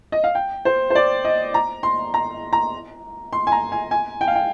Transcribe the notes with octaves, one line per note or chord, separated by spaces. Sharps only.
D#5
F5
G5
C5
C5
D5
D#5
A#5
C6
A#5
A#5
C6
G#5
A#5
G#5
G#5
G5
F5
G5